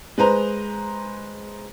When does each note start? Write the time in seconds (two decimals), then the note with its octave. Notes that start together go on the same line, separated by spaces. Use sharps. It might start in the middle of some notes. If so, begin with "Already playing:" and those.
0.18 G#3 B4 C5 A#5